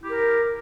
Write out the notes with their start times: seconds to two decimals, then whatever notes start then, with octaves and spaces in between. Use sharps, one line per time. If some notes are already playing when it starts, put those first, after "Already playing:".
0.01 E4
0.05 G4
0.08 A#4